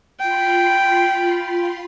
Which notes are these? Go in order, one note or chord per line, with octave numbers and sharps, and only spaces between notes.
F4 G5 B5 C6